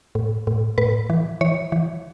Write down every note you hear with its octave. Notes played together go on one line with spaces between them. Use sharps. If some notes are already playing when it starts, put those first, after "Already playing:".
A2
A2
A2 B4
E3
E3 C#5
E3